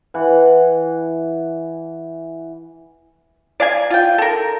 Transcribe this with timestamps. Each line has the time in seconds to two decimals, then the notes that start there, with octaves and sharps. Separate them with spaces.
0.14 E3 F#5
3.60 D5 F5 G#5
3.91 F4 G5
4.18 A4 A#4